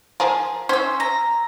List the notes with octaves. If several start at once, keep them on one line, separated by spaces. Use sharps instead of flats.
F3 G#4 A#4
C#4 C5 E6
A#5